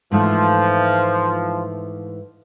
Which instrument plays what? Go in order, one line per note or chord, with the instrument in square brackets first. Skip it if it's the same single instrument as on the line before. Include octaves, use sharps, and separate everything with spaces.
[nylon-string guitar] G#2 E3 A3 [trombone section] F3